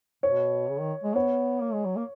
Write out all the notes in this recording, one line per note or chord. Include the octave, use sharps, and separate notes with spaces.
B2 C#5
C#3
D#3
G#3
B3 C#5
A#3
G#3
F#3
A#3